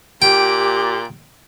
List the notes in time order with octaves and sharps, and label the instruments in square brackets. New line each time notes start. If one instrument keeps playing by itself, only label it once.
[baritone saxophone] A#2 [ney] G4 [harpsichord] G5